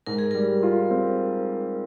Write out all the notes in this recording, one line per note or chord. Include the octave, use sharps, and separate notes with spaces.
G#2 A#4
G#4
G3 A#4
F4
C4